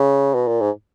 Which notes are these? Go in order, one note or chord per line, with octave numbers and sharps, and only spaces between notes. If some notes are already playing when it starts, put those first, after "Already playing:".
Already playing: C#3
B2
A#2
G#2